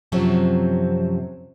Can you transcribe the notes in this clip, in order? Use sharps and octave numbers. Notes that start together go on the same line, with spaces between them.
F#2 C3 F3 F#3 C4